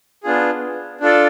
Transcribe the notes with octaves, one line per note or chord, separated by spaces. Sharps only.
B3 D4 F4 G#4
D4 F4 A4 D5